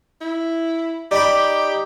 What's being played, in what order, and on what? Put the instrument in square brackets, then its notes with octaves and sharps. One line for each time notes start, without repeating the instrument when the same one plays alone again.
[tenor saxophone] E4
[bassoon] D#4 [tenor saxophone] G4 [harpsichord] D5 G5 B5